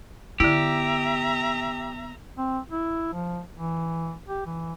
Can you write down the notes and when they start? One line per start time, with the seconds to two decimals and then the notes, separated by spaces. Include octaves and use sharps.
0.40 D3 B3 E4 G4 E5 A#5
2.38 C4
2.71 E4
3.13 F3
3.55 E3
4.28 G4
4.46 E3